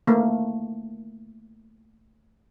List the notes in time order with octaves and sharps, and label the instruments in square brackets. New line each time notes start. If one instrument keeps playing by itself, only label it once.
[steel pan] A3 A#3